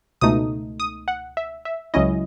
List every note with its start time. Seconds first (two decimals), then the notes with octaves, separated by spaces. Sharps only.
0.21 C#2 B2 A3 D#4 D#6
0.80 D#6
1.08 F#5
1.37 E5
1.65 E5
1.94 C#2 C#3 F#3 C#4 E4 D#5